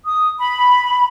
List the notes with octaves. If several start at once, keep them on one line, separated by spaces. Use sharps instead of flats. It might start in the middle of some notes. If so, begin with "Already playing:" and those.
D#6
B5